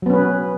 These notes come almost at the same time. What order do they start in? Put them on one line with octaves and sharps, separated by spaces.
F#3 B3 C#4 B4